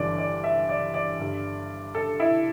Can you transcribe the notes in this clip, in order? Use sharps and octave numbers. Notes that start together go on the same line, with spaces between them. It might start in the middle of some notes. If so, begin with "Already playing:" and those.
Already playing: G1 G2 E3 G3 D5
D5
E5
D5
D5
G1 G2 G3
A4
E4